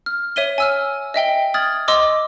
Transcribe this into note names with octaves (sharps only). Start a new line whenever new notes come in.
F6
C#5 E5 D#7 G7
G#5 E6 F6
D#5 E5 G5 G7
D#6 F6 G#6 A6 F#7
D#5 C6 D6 E6